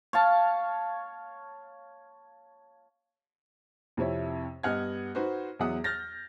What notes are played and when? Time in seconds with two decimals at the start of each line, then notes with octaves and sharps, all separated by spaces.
0.13 C#5 F5 A5
3.97 F2 C3 E4 C#5
4.63 G2 B3 D#5 F#5 F6 G#6
5.15 D#4 F#4 B4 C5
5.59 E2 F#3 E5 F#5 D#6
5.84 F6 G6 A6 A#6